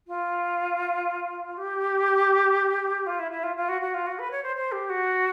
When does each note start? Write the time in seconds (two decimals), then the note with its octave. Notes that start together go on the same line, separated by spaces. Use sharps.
0.07 F4
1.57 G4
3.06 F4
3.19 E4
3.31 E4
3.43 F4
3.56 F4
3.68 F#4
3.81 F#4
3.94 F4
4.07 F#4
4.19 B4
4.31 C#5
4.43 C5
4.56 C5
4.72 G4
4.89 F#4